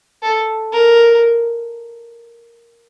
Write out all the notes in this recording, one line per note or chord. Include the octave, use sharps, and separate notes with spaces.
A4
A#4